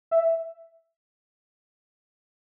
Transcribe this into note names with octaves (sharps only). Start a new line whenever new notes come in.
E5